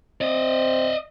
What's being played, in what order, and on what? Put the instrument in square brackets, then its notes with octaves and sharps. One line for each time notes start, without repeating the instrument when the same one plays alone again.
[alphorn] C4 [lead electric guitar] D5 D#5